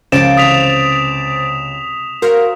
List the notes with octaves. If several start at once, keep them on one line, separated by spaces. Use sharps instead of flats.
C#2 F3 A#3 C5 A6 D7 E7
C3 E3 D#6 B6 F7
F#4 A#4 C5 C#5 F5